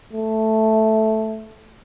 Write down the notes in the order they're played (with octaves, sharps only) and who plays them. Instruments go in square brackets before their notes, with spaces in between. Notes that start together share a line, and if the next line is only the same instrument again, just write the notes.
[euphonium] A3